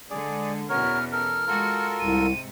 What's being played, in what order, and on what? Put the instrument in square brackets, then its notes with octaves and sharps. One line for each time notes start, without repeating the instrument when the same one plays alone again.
[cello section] D3 G#3 [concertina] G#4 D5
[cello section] E2 B2 C#4 [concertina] F#4 A#4 C#5 [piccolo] F6
[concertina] A4 A#4 [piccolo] F6
[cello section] G#3 F#4 [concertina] F4 A4 A#4
[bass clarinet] C2 [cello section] G#2 C3 [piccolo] D#7